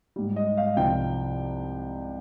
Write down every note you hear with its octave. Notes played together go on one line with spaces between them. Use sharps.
G#2 G3
D#5
F5
C2 C3 F3 G5